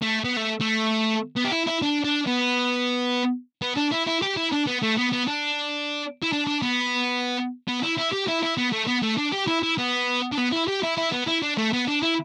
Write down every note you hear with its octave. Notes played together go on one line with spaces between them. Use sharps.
A3
B3
A3
A3
B3
G4
E4
E4
D4
D4
B3
B3
D4
E4
E4
G4
E4
D4
B3
A3
B3
B3
D4
E4
D4
D4
B3
B3
E4
E4
G4
E4
E4
B3
A3
B3
A3
D4
G4
E4
E4
B3
D4
B3
E4
G4
E4
E4
B3
E4
D4
A3
B3
D4
E4